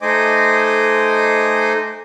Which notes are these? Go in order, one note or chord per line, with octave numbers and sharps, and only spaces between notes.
A3 D#4 C5 D#5 G#5 D6